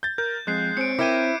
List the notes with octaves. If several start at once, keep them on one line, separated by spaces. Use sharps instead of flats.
G6 A6
A#4 G6
F2 G#3 F#6 C7
C4 C#5 C#7 D7
E4 A#4 E5 G5 D6 G#6 D#7